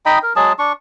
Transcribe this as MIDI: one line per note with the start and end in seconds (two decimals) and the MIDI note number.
0.06 0.19 63
0.06 0.19 75
0.06 0.19 79
0.06 0.19 83
0.23 0.33 70
0.36 0.53 54
0.36 0.53 56
0.36 0.53 68
0.36 0.53 81
0.59 0.73 62
0.59 0.73 85